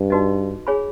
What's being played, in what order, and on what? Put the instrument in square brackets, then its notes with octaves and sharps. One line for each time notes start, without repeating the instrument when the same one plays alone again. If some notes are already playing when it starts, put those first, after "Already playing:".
Already playing: [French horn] G2
[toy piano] D#4 F#4 B4 D#5
G#4 C#5 F5 G#5 B5